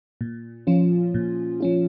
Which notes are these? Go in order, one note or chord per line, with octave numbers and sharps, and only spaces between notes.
A#2
F3 C#4 F4
A#2
F3 C#4 F4